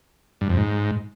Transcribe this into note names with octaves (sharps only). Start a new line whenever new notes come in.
G2
F2
G#2